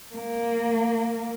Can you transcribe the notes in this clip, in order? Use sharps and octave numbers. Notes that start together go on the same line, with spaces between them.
A#3